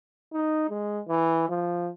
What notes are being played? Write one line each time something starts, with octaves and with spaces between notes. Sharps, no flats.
D#4
G#3
E3
F3